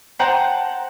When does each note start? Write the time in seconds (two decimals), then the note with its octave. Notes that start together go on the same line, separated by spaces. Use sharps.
0.19 C5 F#5 G5 A5 A#5